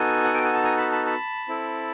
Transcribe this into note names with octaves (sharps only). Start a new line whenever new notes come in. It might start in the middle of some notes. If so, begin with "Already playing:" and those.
Already playing: B3 D#4 F#4 A4 G#5
F#5
G5
G#5
A5
G#5 A#5
A5 B5
A5 B5
A5 B5
C4 E4 A4